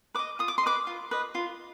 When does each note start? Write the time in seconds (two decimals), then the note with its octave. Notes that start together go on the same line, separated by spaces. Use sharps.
0.15 B4 D#5 D6
0.39 F4 D#6
0.48 D6
0.58 C6
0.63 B4 D#5 D6
0.87 F4
1.11 B4 D#5
1.35 F4